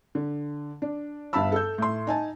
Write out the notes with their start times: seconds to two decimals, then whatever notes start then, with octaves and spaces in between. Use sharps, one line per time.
0.15 D3
0.82 D4
1.33 G1 G2 F5 A5 B5 E6
1.52 A4 G6
1.78 A2 C6
2.07 D#4 G#5 A5